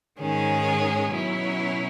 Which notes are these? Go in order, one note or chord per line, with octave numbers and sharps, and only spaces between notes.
G#2 D#3 G#3 C#4 G#4
B2 F#3 C#4 E4